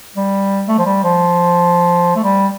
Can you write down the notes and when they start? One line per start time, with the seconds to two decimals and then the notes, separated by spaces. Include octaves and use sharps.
0.16 G3
0.68 A3
0.78 F3
0.85 G3
1.03 F3
2.16 A3
2.24 G3